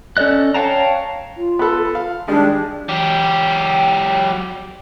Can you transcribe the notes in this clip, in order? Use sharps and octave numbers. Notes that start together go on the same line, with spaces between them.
C#4 A4 D5 D#5 F#6
C#5 F5 G5 A5 A#5
F4
B3 A4
F5
D#3 G3 G#3 D4
F#3 G4